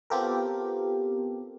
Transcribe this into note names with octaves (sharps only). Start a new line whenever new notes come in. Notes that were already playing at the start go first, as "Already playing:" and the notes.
B3 C4 F4 G4 A4 A#4